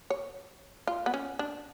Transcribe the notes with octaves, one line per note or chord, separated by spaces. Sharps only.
C#5
F4
B3
C#4
D4